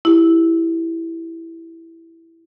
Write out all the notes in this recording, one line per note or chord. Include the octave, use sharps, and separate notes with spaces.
E4 G4